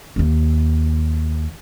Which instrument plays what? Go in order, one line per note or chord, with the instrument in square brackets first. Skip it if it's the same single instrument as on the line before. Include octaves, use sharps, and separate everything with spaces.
[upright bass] D#2 A#3